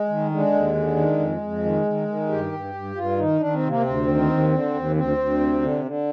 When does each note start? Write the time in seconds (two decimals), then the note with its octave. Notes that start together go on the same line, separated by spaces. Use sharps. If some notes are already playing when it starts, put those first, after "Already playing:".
Already playing: G#3
0.09 D#3
0.31 D3 G#3
0.53 D#2
0.75 D3
0.96 D#3
1.19 F2
1.41 F2
1.63 D#3
1.85 D#3
2.08 D#3
2.29 G2 G4
2.52 G2
2.74 G2
2.96 G2 F4
3.18 D#3 D#4
3.40 D#3 D4
3.54 C4
3.63 C3 A#3
3.82 D2 C4
4.07 D#3
4.29 D#2
4.51 D3
4.74 D#2
4.96 D2 C4
5.18 D2
5.40 C3
5.61 D3
5.84 D3